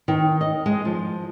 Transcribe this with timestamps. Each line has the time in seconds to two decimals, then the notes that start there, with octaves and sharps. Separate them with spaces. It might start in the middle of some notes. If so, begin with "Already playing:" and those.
0.08 D#3
0.41 D#5
0.66 G#3
0.85 F3